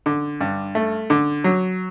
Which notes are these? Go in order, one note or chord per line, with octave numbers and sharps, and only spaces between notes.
D3
G2
A3
D3
F#3